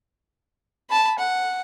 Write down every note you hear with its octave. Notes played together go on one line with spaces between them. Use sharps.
A5 B5
F#5